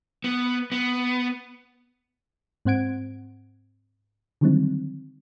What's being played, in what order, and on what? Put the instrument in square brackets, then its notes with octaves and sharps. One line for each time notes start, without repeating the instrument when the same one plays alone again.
[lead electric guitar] B3
B3
[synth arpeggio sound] G#2 C4 C5 F#5 G#6 D7
D3 D#3 F#3 G3 C4 D#4